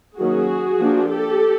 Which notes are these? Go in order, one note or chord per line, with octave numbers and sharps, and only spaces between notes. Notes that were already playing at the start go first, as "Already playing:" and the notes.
D#3 F#3 A#3 C#4 F#4 G#4
F3 A#3 D4
G4 A4